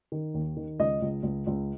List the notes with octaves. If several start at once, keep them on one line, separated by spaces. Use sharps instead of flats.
D#3
D#2
D#3
C#2 D#5
C#2
C#2
C#2